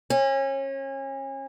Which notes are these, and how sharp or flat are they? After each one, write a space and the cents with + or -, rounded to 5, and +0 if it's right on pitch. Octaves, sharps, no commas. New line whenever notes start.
C#4 -30